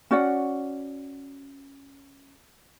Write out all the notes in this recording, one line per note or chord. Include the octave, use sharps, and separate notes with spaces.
C#4 F#4 D5 F#5